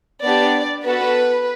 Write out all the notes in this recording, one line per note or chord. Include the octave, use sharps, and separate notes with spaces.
B3 D4 G4 D5
B3 F#4 A4 B4